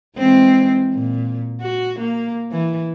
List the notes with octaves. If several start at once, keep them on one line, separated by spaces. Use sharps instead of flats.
E3 G#3 C4
A#2
F#4
A#3
E3